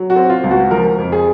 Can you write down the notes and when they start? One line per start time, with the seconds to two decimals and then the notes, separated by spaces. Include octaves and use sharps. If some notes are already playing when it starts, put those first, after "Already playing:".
Already playing: F#3
0.10 F#4
0.16 C4
0.30 F4
0.44 C#2
0.51 F#4
0.71 F3 A#4
0.99 F2
1.12 G#4